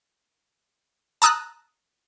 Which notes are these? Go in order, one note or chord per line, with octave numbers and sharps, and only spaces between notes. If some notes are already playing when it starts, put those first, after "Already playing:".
A5 A#5 D#6 E6 F#6